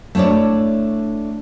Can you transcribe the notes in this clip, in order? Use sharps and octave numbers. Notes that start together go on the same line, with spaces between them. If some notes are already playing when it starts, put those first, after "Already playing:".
A3 D4 E4 C#5 D5